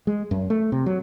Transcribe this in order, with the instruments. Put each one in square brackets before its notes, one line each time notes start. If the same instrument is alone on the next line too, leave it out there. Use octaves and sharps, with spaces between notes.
[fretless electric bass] G#3
F#2
A3
C3
F#3